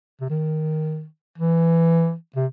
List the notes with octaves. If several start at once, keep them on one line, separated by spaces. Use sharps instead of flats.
C3
D#3
E3
C3